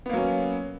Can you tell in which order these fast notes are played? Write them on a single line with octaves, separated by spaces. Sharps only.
B3 A#3 F#3 C#4